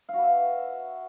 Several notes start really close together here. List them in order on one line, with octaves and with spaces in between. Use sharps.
F5 F#4 B4 E5